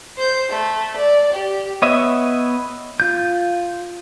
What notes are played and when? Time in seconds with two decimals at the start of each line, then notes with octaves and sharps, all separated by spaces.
0.17 C5 G6
0.49 A3
0.97 D5
1.33 G4
1.82 B3 C#5 D#5 E5
3.00 F4 G6